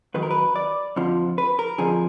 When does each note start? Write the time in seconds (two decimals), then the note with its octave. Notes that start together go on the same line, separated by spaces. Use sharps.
0.14 F#2 D#3 F#3 B4
0.23 A#4
0.31 B4
0.56 D5
0.96 F2 D3 F3
1.38 B4
1.59 A#4
1.78 F2 D3 F3 G#4